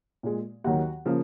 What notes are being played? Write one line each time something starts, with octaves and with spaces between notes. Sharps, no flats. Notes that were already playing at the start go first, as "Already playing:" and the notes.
A#2 G#3
D#2 D#3 F#3 F#4 F#5
C#3 F3 A#3